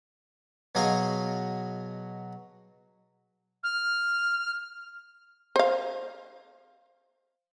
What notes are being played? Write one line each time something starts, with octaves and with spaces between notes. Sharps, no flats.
B2 F#3 G#4 D#5 F5 C#6
F6
C5 F5